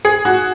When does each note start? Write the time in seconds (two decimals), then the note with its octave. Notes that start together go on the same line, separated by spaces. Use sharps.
0.05 G#4
0.25 F#4